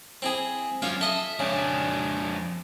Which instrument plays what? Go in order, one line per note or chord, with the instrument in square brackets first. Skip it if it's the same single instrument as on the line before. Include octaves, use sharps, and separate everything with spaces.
[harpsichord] C4 E4 G#4
[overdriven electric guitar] F#3 C#4 [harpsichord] F4 E5 F5
[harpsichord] A4 D#5 [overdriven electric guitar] E5
[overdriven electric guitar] F2 D4 [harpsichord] C#3